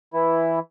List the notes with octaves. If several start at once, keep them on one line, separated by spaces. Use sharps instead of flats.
E3 E4